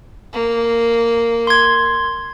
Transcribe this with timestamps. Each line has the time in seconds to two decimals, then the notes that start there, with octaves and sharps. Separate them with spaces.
0.33 A#3
1.47 C6 G#6